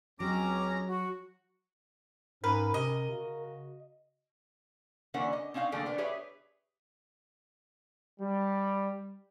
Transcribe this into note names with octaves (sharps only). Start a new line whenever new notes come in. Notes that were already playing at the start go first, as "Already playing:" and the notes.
C#2 F#3 G#3 C4 C#4 A#5 D6
F#4
G#2 C#4 A#4 B4
C3 D#5
C#3 F#4
D3 E3 A#3 C#4 A#4 F#5
D#5
C4 C#4 D#4 F5 F#5
D3 F3 A3 A#3 G#4 G5
B3 D4 A#4
G4 G#4 B4 C#5 E5
G3